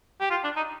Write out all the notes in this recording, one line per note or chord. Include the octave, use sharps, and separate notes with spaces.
G4
F4
D4
D#4